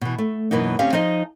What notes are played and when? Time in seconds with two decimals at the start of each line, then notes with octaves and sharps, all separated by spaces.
0.01 B2 E3
0.18 A3
0.51 F#2 B2 E3 F#3 A#3 D#4
0.79 D2 C4 C#4 G4 F5
0.93 F3 D#4 G#4 D#5 G#5